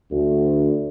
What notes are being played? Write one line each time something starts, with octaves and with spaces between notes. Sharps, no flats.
D2